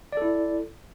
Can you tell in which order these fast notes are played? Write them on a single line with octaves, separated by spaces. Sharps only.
D5 A4 E4